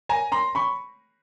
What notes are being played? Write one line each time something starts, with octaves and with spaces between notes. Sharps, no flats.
G#5 A#5
A#5 C6
B5 C#6